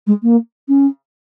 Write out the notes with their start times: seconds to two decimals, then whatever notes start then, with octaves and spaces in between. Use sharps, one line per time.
0.06 G#3
0.22 A#3
0.68 C#4